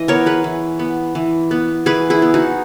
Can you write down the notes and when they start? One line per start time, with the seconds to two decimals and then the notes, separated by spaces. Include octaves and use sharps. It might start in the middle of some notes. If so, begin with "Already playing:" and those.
Already playing: E3 D#5
0.08 B3 A#4 C#5
0.26 G#4 B4
0.44 E3
0.79 B3
1.15 E3
1.51 B3
1.86 E3 G#4 B4
2.10 E4 G#4
2.22 B3
2.34 D#4 F#4